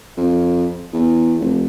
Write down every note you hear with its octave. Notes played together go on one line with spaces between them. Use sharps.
F2
E2
F1